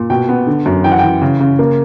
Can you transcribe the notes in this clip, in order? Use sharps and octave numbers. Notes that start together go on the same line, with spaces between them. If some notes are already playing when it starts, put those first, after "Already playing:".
Already playing: A#2
B2 G5
B3
D3
F#2
E3 G5
F#5
E3 G5
C#3
C#3
A#3